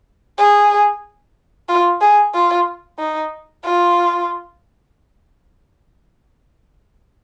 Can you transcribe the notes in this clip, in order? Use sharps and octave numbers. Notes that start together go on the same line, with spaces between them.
G#4
F4
G#4
F4
D#4
F4